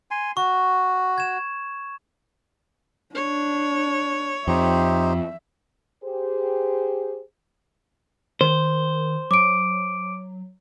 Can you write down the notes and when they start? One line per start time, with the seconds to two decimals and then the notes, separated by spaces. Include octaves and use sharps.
0.11 G#5 C6
0.37 F#4 C#6
1.18 G#6 E7
3.15 D4 C#5
4.48 F2 D#4 G4 C5 E5
6.04 G4 G#4 C5
8.41 D#3 C5
9.31 F#3 D6 D7